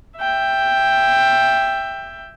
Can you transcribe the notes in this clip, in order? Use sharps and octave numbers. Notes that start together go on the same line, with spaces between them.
E5 G5